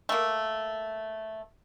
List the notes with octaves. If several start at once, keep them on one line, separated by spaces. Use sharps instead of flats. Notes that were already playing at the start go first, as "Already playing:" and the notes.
A3 A#3